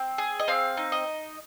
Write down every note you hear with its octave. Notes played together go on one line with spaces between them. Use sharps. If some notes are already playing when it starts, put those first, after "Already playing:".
Already playing: C4
G#4
D#5
C4 F5
D#4
D#5